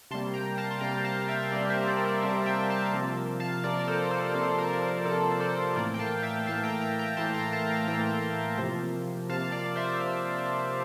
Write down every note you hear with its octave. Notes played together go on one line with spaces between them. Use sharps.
C3 G3 A#3 A5 C6
G5 A#5
F5 A5
C6
C3 G3 A#3 G5 A#5
F5 A5
E5 G5
C3 G3 A#3 D5 F5
C5 E5
A#4 D5
A#4 D5
C3 G3 A#3 C5 E5
E5 G5
F5 A5
C3 F3 A#3
F5 A5
C3 F3 A#3 A#4 D5
A4 C5
A4 C5
C3 F3 A#3 A4 C5
A#4
A#4
C3 F3 A#3 A4
D5
A4 C5
A2 E3 A#3 A#4 D5
G5
F5 A5
E5 G5
A2 E3 A#3 F5 A5
G5 A#5
G5 A#5
G5 A#5
A2 E3 A#3 A5 C6
G5 A#5
F5 A5
G5 A#5
A2 E3 A#3 G5 A#5
C3 F3 A#3
C3 F3 A#3 F5 A5
D5 F5
C5 E5